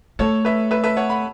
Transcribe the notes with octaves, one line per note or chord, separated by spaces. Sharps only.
A3 A4 C#5
B4 E5
B4 E5
B4 E5
C#5 F#5
F#5 B5